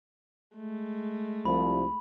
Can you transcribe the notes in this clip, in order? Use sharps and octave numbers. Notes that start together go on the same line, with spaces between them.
G#3 A3
C2 F3 B5